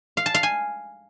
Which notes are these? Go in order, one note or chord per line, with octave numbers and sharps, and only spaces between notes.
F5
A5
F5
G#5